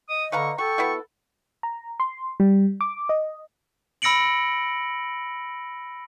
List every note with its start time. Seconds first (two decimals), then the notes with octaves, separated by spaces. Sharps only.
0.09 D#5 D#6
0.32 D3 B4 F5 A#5 C#6
0.58 F#4 A4 G5 C#6
0.78 B3 E4 F#4
1.63 A#5
2.00 C6
2.40 G3
2.81 D6
3.09 D#5
4.02 B5 E6 A#6 C#7 D7 F#7